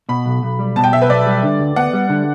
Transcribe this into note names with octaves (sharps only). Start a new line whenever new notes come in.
B2 B5
B1
B1
G3
B2 A5
G5
B1 E5
B4
B1 D5
G3
D3
D2
B3 F#5
G3
D3